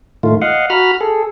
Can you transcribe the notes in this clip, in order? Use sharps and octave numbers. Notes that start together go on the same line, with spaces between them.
A2 D#3 A3 F4
D#5 F5 F#5
F#4 A#5 B5 F6
G#4 A4